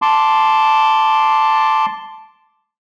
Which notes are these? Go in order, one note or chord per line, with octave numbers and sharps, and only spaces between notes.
A5 C6 D6